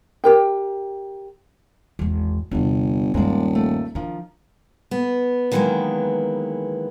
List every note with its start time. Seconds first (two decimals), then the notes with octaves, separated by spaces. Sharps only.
0.24 G4 A#4 G5
1.99 G#1 E2
2.51 G1 E2 C3
3.14 D#1 G2 D#3 G#3 A#3 D5
3.55 A3 A#3
3.95 D#3 F3 D4
4.91 B3
5.52 D#3 E3 F#3 G#3 A#3 B3